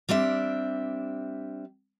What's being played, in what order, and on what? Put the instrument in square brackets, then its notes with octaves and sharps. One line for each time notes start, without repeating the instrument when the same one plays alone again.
[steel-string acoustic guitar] G3 C4 D4 E5